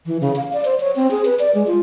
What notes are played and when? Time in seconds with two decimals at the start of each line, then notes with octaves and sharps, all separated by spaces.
0.06 E3
0.21 C#3
0.36 F5
0.53 D5
0.65 C5
0.80 C#5
0.96 C4
1.11 G#4
1.25 B4
1.39 D5
1.55 G#3
1.67 F4